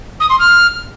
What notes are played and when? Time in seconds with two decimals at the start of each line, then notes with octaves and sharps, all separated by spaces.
0.20 D#6
0.29 C6
0.39 F6